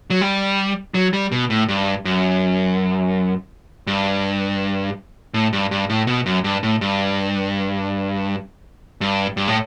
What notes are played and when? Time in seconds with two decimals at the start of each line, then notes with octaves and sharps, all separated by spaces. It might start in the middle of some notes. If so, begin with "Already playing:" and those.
0.10 F#3
0.21 G3
0.94 F#3
1.13 G3
1.32 B2
1.50 A2
1.68 G2
2.05 F#2
3.87 G2
5.34 A2
5.53 G2
5.71 G2
5.89 A2
6.07 B2
6.26 F#2
6.44 G2
6.63 A2
6.81 G2
9.01 G2
9.37 G2
9.48 A2